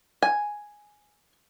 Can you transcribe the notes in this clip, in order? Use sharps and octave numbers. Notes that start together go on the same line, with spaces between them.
G#5